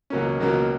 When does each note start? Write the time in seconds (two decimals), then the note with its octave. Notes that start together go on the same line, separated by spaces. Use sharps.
0.10 C#2 B2 F#3 A#3 C#4
0.40 C#2 B2 F#3 A#3 C#4